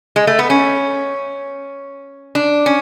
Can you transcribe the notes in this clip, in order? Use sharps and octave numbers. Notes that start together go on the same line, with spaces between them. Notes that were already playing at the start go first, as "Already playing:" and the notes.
G#3
A3
B3
C#4
D4
C#4